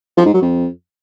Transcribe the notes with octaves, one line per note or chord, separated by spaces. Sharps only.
F3
G#2
F#3
F2